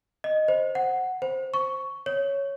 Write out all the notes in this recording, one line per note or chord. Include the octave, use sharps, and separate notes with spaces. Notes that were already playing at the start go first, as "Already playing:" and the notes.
D#5
C5
F#5
C5
C#6
C#5